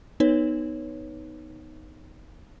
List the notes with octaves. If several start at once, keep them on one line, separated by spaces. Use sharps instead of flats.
B3 D#4 B4 C#5